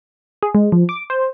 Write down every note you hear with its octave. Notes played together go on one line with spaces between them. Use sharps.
G#4
G#3
F3
D6
C5